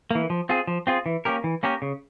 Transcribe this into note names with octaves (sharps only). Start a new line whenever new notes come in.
E3 A#3
F3
C4 F4 G#4
F3
C4 F4 G#4
E3
A#3 C#4 G4 A#4
E3
A#3 C#4 G4 A#4
C#3